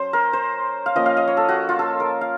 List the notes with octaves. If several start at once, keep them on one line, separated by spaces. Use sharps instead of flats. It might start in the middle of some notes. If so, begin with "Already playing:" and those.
Already playing: F#3 C#4 C5
A#4
C5
F5
F3 A#3 C#4 F4 D#5
F5
D#5
C#5
A4
F#4
F4
A4
A#4
F5